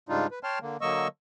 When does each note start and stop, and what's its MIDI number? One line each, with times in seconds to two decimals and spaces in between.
0.09 0.27 44
0.09 0.27 49
0.09 0.27 55
0.09 0.27 62
0.09 0.27 63
0.09 0.27 65
0.31 0.39 71
0.43 0.59 73
0.43 0.59 79
0.43 0.59 81
0.43 0.59 84
0.43 0.59 89
0.61 0.77 50
0.61 0.77 58
0.81 1.08 50
0.81 1.08 54
0.81 1.08 58
0.81 1.08 75
0.81 1.08 85
0.81 1.08 88